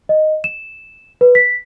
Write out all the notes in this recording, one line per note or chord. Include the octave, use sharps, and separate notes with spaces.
D#5
E7
B4
B6